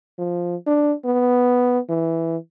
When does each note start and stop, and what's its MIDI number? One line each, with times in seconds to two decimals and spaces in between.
0.19 0.56 53
0.67 0.93 62
1.05 1.79 59
1.90 2.37 52